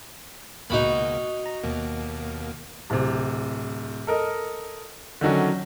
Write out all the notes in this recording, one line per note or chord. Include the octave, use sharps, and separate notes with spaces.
C#2 B2 A#3 D#4 F#4 B5
A#5
D#2 B2 A#3
D1 C3
A4 A#4 D#5
D3 D#3 F#3 C#4